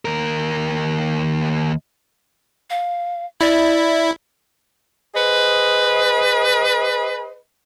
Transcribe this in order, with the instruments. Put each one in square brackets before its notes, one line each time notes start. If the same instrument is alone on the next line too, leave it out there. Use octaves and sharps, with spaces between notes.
[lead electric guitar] D#2 A#4
[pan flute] F5
[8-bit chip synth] E4 [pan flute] D5
[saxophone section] G#4 B4 C5 D#5